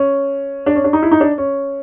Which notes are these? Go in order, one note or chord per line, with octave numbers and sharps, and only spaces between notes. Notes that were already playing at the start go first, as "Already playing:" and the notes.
Already playing: C#4
D4
C#4
D4
D#4
E4
D#4
D4
C#4